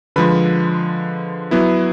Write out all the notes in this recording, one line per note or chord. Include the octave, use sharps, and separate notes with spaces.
D3 F3 G#3 B4 B5
F#3 B3 E4